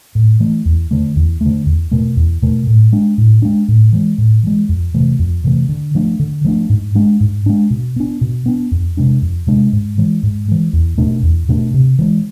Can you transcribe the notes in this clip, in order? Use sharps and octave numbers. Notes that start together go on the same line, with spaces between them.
A2
E3 A3
E2
D3 A3
E2
D3 A3
E2
B2 A3
E2
B2 A3
A2
G#3 D4
A2
G#3 D4
A2
E3 G#3
A2
E3 G#3
F2
C3 E3 A3
F2
C3 E3 A3
D3
F3 A3 D4
D3
F3 A3 D4
G#2
G#3 D4
G#2
G#3 D4
B2
B3 D4
B2
B3 D4
F2
C3 G#3 D4
F2
C3 G#3 D4
G#2
E3 G#3
G#2
E3 G#3
E2
B2 A3 D4
E2
B2 A3 D4
C3
E3 G#3